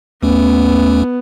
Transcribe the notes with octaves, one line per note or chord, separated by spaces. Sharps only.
D#2 A3 B3 C#4